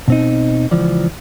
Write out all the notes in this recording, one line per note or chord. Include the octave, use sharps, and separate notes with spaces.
B2 C4 D#4
C#2 E3 F3 D5